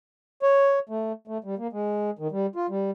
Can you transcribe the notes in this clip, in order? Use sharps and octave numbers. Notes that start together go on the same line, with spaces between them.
C#5
A3
A3
G3
A#3
G#3
D#3
G3
F4
G3